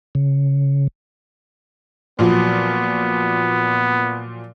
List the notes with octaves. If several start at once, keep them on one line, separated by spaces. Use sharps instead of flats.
C#3
A#2 F3 F#3 B3